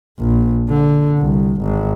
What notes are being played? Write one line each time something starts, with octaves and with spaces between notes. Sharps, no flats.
A#1
D3
C2
G#1